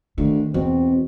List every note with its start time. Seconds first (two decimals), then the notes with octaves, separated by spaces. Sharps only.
0.18 D2 D#3
0.54 E2 B2 C4